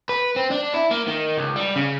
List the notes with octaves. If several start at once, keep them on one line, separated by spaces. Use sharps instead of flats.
B4
C4
D4
E4
A#3
D#3
C#2
G3
C#3